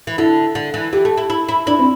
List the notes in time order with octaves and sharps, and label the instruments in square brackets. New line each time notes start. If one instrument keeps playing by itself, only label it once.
[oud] E3
[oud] D3 [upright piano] E4
[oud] D3
E3
[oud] E3 [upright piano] G4
[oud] A3
E4
E4
E4
[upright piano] D4 [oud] E4
[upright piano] C4